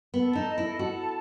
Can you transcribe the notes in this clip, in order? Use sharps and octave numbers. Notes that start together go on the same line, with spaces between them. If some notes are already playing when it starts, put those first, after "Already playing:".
B3 A4
A5
D#4
D#5
E4
A4
F#4 A4
A5